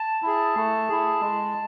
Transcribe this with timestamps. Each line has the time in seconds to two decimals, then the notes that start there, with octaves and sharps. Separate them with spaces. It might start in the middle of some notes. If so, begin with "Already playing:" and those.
Already playing: A5
0.22 E4 G#4
0.56 A3
0.89 E4 G#4
1.21 G#3